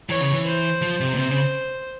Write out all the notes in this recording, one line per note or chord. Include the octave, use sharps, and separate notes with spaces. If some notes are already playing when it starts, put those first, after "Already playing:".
E3 C#5
C#3
E3
C5
F3
C3
A#2
C3 C5
C#3